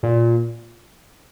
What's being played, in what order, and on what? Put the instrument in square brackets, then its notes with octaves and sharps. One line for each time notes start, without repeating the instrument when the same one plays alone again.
[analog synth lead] A#2